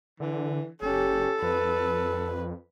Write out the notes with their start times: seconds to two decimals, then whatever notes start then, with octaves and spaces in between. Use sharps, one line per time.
0.20 D3 E3
0.82 F#1 C#4 G4 A4
1.42 F2 B4